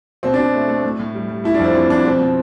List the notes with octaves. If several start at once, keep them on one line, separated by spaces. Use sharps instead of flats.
B2 C4
D4
B2
A3
A3
A2
A2
G3
G3
A3 E4
D4
F2 C4
E3 C4
F2 D4
B2 C4
B2